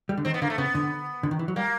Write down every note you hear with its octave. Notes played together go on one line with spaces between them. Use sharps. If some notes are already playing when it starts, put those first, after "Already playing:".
G3
D3
D#3 C4
B3
D3 A#3
A3
C#3 B3
D3
D3
D#3
E3
F#3
G3 A#3